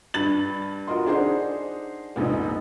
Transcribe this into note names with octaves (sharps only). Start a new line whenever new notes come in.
G2 A6 F#7
F4 F#4 A#4 D#5 C6
D4 D#4 G#4 C5 F#5 C6
F1 A#1 G#2 D#4